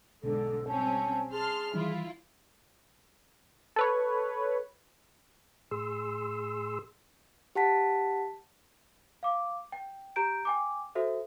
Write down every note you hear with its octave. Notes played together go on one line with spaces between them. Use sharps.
B1 G#2 D3 A4
G3 C4 C#4 A5
G#4 A5 C6 F6
D#3 E3 G3 E4 F4
A4 B4 C#5
A2 G#4 C6 E6
G4 F#5 A5 B6
F5 D6
G5
G4 A#5 G6 D7
G5 G#5 D6
F#4 A4 C5 E5